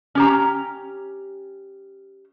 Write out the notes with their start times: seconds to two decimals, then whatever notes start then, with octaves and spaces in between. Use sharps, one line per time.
0.15 C#4 G4 A#5